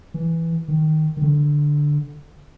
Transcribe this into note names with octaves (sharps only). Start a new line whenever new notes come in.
E3
D#3
D#3
D3